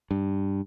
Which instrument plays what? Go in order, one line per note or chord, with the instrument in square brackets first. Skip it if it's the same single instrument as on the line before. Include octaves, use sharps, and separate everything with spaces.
[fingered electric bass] G2